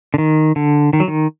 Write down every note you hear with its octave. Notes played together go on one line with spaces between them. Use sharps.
D3
D#3
D3
D#3
F#3
D#3